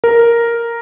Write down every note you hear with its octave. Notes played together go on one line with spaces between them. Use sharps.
A#4